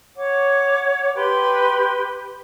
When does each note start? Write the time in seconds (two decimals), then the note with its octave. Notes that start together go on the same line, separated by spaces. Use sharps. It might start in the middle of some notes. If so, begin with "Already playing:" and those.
0.16 C#5 F#5 D6
1.15 G4 B4 G5 C6